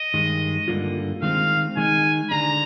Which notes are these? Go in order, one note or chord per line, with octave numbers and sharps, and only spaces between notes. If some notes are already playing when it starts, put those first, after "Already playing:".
Already playing: D#5
G2 D#3 G#3
G2 D3 G3 A#3 F4
D#3 G#3 C4 F5
D#3 G#3 D#4 G#5
D3 G#3 D4 A#5